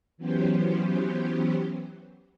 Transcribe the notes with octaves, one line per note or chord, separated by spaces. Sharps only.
E3 F#3 B3 C#4 G4 C5